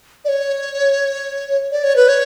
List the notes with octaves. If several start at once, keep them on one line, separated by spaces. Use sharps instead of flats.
D5
C#5
D5
C#5
B4
C#5